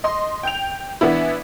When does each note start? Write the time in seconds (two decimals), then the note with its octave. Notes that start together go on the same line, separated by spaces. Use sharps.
0.04 D#5 C6
0.43 G5 G6 F7
1.01 E3 B3 D4 E4